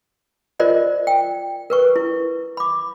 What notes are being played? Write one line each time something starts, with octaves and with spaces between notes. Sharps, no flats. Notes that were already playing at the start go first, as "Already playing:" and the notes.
F4 A#4 C5 D5 D#5
G5
A#4 B4 C#6
E4
B5 D6